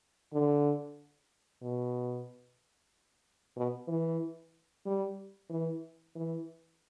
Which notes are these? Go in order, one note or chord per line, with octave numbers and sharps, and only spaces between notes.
D3
B2
B2
E3
G3
E3
E3